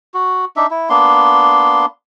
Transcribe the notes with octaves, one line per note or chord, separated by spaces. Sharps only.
F#4
D4 D#4 E5
E4
A#3 B3 D4 C6